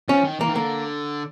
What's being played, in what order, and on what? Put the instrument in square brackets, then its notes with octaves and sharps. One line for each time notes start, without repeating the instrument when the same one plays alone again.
[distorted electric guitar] F3 [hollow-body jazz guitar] C#4
[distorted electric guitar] D#3
[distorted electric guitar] E3 [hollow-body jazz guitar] A#3
[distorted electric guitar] D#3
[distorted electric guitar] D3 [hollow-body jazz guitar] A#3